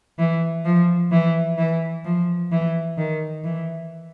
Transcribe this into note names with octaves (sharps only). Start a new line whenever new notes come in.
E3
F3
E3
E3
F3
E3
D#3
E3